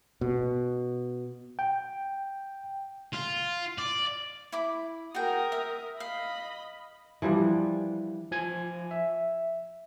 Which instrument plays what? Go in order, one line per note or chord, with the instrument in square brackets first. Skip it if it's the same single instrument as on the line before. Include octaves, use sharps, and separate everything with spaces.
[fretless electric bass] B2
[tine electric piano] G5
[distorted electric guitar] F4
D5
[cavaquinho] E4 B5 D6
[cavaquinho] F#4 G#4 G5 [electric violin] A#4 D#6
[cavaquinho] E5
[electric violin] D#5 B5 [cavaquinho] F5
[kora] E3 F3 G3 D4
[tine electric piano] F3 G#5 G#6
E5